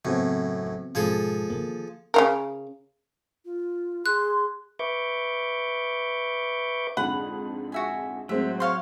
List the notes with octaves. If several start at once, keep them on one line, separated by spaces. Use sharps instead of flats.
F#2 A2 C#3 B3 C4
E3
G#2 B2 F3 G#4 A4
D3 D#3 A#3
C#3 E3 A#4
F4
G#4 C6 F#6
B4 E5 C#6 D6 G6
F2 G#2 D3 F#5 B5
F#4 E5 G#5
A2 F#3 G#3 C4 E5
C#5 F5 C6